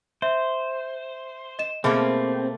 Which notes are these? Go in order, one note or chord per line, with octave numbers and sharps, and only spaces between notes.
C5 E5
D#5 E7
B2 A3 A#3 C4 G#4